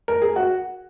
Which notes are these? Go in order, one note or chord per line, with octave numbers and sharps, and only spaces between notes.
A#4
G#4
F#4